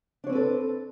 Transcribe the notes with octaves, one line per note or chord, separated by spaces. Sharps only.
C4 D4 A4 B4 C#5